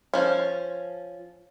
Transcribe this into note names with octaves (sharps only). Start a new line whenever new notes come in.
F3 C#4